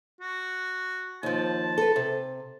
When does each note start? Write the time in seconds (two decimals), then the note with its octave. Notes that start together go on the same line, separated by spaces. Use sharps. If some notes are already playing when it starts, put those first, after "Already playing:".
0.21 F#4
1.23 D#2 F3 A5
1.78 A4 B4
1.96 C3